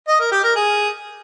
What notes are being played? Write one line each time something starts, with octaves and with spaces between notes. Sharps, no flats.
D#5
A#4
G4
A#4
G#4